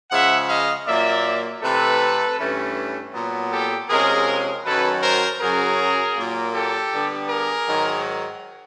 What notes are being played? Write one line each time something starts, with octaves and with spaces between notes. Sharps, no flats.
C#3 F3 G#3 E5 F#5
D#5 F5
A#2 F#3 A#3 D5 E5
C3 E3 A3 A4 B4
G2 E3 A3 C#4
A#2 F#3 B3
G4 A4
C3 F3 G#3 C#4 G#4 A#4
F#2 D#3 F#3 A4 B4
A#4 C5
F#2 C#3 F#3 G#4 A#4
A#2 F#3 A#3
G4 A4
D3 G3 B3
G#4 A#4
G#2 D#3 F#3